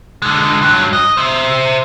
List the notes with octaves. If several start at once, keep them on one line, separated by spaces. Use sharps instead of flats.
D3 G#3
G2 F#3
D#5
C5 E5